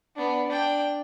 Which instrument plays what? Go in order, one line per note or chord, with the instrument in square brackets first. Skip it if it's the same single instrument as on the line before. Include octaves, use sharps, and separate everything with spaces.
[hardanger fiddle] B3 D4
D4 G5